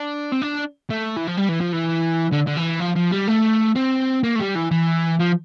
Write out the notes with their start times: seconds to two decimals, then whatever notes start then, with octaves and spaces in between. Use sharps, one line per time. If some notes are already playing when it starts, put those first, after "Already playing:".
Already playing: D4
0.32 C4
0.42 D4
0.90 A3
1.17 E3
1.27 F3
1.37 G3
1.49 E3
1.61 F3
1.73 E3
2.32 D3
2.47 D3
2.57 E3
2.80 F3
2.96 F3
3.12 G3
3.28 A3
3.76 C4
4.23 A#3
4.35 A3
4.40 G3
4.55 E3
4.71 E3
5.19 F3